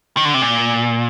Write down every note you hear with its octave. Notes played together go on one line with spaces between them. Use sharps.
D#3
D3
C3
A#2